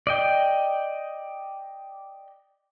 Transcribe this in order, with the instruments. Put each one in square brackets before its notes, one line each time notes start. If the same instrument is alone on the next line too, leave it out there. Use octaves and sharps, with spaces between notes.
[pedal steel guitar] D5 D#5 G5